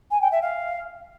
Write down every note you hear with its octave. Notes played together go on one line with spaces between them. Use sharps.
G#5
G5
E5
F5